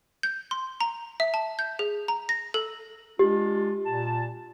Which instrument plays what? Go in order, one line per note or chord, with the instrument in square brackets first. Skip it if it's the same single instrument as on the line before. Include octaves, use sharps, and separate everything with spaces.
[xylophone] G6
C6
A#5
E5
A5
G6
G#4
A#5
A#6
A4
[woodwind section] G#3 D4 F4 [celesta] G4
[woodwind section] A#2 A5